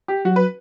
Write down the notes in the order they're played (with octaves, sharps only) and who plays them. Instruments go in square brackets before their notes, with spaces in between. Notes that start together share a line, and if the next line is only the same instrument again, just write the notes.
[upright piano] G4
[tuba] F#3 [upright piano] F#4
[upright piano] B4